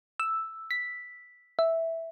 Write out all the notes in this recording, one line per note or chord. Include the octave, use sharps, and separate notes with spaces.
E6
B6
E5